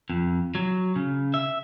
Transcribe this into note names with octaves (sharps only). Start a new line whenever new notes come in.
F2
F#3
C#3
E5